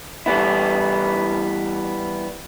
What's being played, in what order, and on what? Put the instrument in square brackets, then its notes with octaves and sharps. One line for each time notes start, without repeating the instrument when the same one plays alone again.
[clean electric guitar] E3 G3 B3 E4